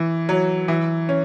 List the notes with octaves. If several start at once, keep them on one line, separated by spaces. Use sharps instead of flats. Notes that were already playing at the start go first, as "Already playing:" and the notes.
Already playing: E3
F#3
E3
C#4